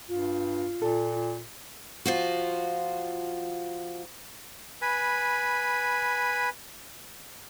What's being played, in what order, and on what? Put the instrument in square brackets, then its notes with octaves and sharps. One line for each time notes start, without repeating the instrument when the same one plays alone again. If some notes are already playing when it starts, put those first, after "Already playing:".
[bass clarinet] G2 [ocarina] F4
[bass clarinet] A#2 [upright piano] A4
[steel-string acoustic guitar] F3 F4 F#4
[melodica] B4 G#5 B5